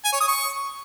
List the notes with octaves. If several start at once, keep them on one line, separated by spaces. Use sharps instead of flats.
G#5
C#5
D#6
C#6